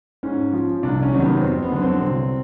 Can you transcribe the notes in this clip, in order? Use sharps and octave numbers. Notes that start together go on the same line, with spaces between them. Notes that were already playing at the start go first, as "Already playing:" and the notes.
G#2 C#4
F3
C2 D4
C#4
C3 D#3 F#3
B3
F2 C4
B3
D3 F#3
C4
C2